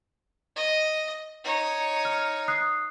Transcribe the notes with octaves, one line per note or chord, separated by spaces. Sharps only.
D#5
D#4 C#5
F6
D#6 F#6 C7